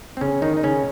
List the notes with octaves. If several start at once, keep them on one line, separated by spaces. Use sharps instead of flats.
C4
C#3 C#4
D#3 D#4
D#4
C#3 C#4